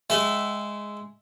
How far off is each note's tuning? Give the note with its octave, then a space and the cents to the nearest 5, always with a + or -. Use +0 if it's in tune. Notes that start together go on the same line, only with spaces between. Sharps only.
G#3 +0 E5 +0 G5 -40